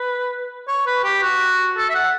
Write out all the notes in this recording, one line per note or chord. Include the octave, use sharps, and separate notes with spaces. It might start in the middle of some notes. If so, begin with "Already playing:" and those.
Already playing: B4
C#5
B4
G4
F#4
A4
E5
F#5